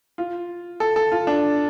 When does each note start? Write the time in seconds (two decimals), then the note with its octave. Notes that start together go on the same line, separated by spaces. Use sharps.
0.18 F4
0.80 A4
0.96 A4
1.12 F4
1.27 D4